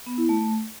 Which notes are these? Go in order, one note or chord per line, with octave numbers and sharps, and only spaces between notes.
B3
E4
A3